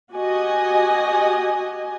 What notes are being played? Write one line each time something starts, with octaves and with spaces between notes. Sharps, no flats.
F#4 G4 D#5 G#5